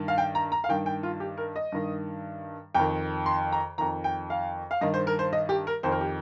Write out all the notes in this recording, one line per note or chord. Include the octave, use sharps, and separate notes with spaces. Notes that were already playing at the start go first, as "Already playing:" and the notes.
Already playing: G2 D#3
F5
G5
A#5
A#5
F5
G2 D#3 G5
G5
F4
G4
A#4
D#5
G2 D#3
F2 D#3 G5
C6
A#5
F2 D#3 A#5
G5
F5
F5
G2 D#3 D#5
C5
A#4
C5
D#5
G4
A#4
F2 D#3 C5
A#4
G4